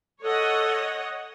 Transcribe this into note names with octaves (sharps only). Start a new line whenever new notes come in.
A4 C#5 D#5 F#5